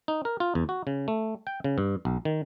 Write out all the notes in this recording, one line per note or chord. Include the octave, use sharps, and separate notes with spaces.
D#4
A#4
F4
E2
F#4
C#3
A3
G5
C#3
G2
B1
D#3